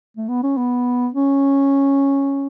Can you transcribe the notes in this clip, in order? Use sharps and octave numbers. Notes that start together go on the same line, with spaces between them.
A3
B3
C#4
B3
C#4